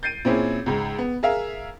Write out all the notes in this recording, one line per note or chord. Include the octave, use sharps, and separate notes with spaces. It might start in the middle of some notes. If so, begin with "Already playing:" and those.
G6 A6 C7 D7 D#7
A#2 C4 C#4 E4 G#4
C#2 G#2
B3
G#4 A#4 E5 F5